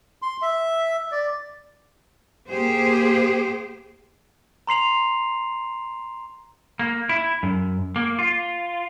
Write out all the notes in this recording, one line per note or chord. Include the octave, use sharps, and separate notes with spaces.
C6
E5
D5
A#3 G4 G#4 C5
A#5 C6 C7 F7
A#3
E4
F#2
A#3
F4